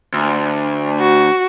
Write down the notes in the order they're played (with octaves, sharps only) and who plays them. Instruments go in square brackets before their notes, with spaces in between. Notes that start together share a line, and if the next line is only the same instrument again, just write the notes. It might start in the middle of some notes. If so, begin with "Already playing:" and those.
[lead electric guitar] D2
[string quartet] F#4